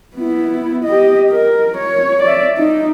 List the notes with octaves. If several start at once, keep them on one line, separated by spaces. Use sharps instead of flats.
B3 E4
G4 D#5
A#4
C#5
D5 E5
D#4